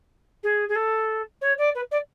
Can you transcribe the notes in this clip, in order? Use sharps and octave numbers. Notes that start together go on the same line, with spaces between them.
G#4
G#4
A4
C#5
D5
B4
D5